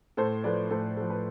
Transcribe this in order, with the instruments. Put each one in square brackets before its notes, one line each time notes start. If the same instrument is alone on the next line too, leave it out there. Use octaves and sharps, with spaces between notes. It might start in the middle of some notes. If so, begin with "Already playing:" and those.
[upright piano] A2 A4 C5
F3 A3 B4 D5
A2 A4 C5
F3 A3
B4